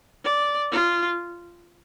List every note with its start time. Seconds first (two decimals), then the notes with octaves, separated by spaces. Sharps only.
0.24 D5
0.72 F4